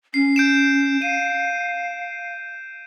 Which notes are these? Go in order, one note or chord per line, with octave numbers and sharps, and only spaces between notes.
C#4 C7
G6 D7 E7
F5 D#7